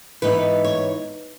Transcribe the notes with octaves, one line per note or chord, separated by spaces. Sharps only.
G#2 E3 B3 D#4 B4
C#5